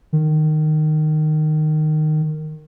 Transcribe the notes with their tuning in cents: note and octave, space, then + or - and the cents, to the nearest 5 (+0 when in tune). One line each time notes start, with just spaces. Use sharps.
D#3 -15